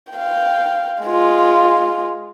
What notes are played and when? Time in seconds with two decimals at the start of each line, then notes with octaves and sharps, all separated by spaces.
0.12 F5 G5
1.03 G#3 F4